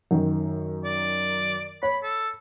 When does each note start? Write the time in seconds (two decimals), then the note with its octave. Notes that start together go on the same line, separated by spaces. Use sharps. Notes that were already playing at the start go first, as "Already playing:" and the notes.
0.11 F#2 D#3
0.84 D5
1.83 C#5 B5
2.03 A4